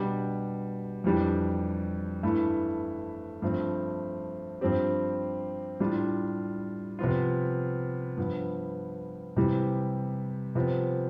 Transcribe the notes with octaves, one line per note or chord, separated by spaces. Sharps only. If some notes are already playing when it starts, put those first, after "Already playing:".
Already playing: B2 G3 B3 D4 G4
F2 E3 G3 D4 G4
G2 E3 A3 E4
G2 F3 A3 C4
G2 F3 C4 G4
A2 G3 D4 F4
C3 F3 B3 F4
G2 F3 B3
C3 E3 G3
C3 F3 B3 F4